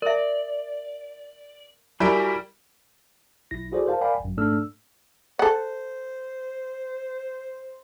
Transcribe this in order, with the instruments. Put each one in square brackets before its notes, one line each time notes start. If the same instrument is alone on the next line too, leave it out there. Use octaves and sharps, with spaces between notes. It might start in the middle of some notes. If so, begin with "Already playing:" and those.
[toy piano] A#4 E5 [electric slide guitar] D5
[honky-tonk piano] G3 [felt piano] E4 A#4 D7 [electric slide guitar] F#4 G4 G#5
[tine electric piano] B1 E4 A#6
E4 F#4 G#4 A4 C5 D5
A#4 C5 F5 A5
A#4 D5 F5 G5 G#5 B5
G#1 F#2
G#2 A3 D4 A4 E6 F6
[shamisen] A4 F#5 [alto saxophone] C5